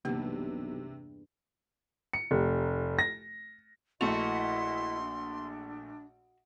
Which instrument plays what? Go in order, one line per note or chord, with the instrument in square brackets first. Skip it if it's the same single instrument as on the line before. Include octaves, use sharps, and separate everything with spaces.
[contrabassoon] B1 [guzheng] E2 G2 [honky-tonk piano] C3 [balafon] A#3
[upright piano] C#7
F1
A#6
[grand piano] A#1 A3 F7 [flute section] E4 B4 D#5 [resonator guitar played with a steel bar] F#4 [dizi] C6
[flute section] D4